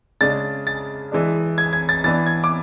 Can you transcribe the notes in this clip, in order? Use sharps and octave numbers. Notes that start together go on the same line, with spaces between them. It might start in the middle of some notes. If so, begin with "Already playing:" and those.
C#3 G#3 D4 A6
A6
E3 G#3 D4
G#6
G#6
A6
E3 B3 D4 A6
G#6
D6